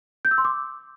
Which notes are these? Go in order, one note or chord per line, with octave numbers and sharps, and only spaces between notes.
G6
E6
C6
D6